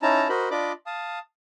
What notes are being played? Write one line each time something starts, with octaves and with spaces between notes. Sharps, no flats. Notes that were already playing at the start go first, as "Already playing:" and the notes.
C#4 D#4 E4 A5 A#5
F#4 A#4 C5 D#5 B5
D4 F4 D5 D#5 B5 D6
F5 A5 D#6